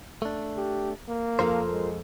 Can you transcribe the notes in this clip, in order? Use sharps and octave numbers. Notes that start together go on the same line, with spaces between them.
A3 D4
G4
A#3
F2 F4 A4 A#4 C5 F5
G#3